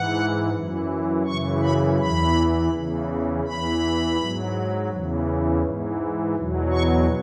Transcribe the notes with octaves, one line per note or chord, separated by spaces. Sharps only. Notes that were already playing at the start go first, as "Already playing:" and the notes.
Already playing: G#2 E3 F#5
F#2 E3
F#2 C#3 E3 C#6
B5
E2 E3 B5
E2 C#3 E3
E2 E3 B5
G#2 F#3
E2 C#3 E3
G#2 E3
E2 B2 F#3
C#6